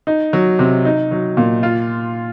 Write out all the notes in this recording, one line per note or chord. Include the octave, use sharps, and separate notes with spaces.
D#4
F#3
C3
D#4
F#3
A#2
F4